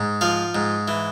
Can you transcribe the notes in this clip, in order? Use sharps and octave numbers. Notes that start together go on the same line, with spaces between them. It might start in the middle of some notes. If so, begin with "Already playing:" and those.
Already playing: G#2
F3 F5
G#2
E3